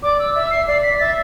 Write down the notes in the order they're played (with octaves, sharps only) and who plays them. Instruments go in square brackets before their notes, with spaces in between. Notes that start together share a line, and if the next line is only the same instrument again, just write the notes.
[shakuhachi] D5 [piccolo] D6
[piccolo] E6
[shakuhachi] E5 [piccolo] E6
[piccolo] C7
[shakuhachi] D5 [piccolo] C7
[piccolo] B6
[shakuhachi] E5 [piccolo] A6